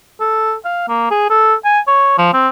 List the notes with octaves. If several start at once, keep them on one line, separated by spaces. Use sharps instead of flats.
A4
F5
A#3
G#4
A4
G#5
C#5
F3
C4